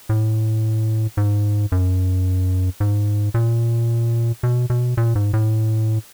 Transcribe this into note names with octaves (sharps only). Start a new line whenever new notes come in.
A2
G#2
F#2
G#2
A#2
B2
B2
A#2
G#2
A2